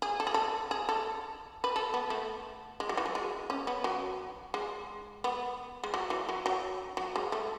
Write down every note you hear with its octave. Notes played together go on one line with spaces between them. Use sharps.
G#4
A4
G#4
A4
G#4
A4
B4
A4
B3
A3
G#3
F#3
E3
F#3
G#3
C#4
B3
F#3
G#3
B3
G#3
F#3
E3
F#3
F#3
F#3
G#3
A3